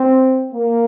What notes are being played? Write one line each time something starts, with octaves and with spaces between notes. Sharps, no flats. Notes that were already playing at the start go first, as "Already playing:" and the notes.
Already playing: C4
A#3